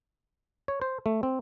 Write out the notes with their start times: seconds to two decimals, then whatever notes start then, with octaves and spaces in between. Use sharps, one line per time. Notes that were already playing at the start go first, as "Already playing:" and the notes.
0.68 C#5
0.82 C5
1.06 A3
1.23 C4